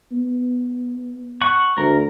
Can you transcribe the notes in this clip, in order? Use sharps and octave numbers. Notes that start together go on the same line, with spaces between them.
B3
F#5 C#6
D2 A#4